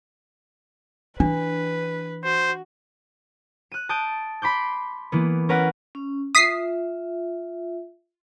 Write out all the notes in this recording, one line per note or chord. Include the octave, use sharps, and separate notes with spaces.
E3 D4 B4
F#4 C5
F#6 D#7
A5 D#6 G6 D7
B5 C6 D6 G6
E3 A#3 B3
C#4 A#4 B4 F#5
C#4
F4 E5 D#6 B6 C7